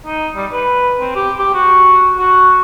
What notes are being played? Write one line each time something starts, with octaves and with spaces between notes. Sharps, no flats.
D#4
G3
B4
C4
G4
G4
F#4
F#4